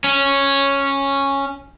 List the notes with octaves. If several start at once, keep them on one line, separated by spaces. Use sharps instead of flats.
C#4